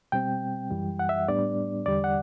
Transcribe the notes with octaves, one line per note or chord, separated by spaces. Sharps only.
B2 G3 C4 G5
F#2 E3 G3
F#5
E5
A2 G3 B3 D4 D5
E2 D3 G3 D5
F#5